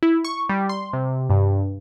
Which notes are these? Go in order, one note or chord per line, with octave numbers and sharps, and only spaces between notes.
E4
C#6
G3
C6
C3
G2